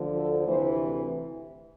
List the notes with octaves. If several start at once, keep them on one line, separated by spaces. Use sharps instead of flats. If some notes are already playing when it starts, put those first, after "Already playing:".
Already playing: D2 D3 F3
A4
D2 C3 E3 C5